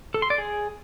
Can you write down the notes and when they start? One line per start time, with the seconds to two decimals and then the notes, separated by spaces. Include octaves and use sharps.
0.14 A4
0.22 C6
0.30 D5
0.38 G#4